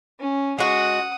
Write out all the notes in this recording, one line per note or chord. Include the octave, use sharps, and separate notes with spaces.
C#4
G#3 F#4 F#5 D#6